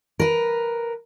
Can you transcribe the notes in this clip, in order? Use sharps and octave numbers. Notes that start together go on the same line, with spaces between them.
A#4 B4